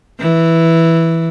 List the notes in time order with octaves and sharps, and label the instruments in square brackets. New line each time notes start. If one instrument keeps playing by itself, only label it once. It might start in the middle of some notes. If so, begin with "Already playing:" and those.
[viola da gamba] E3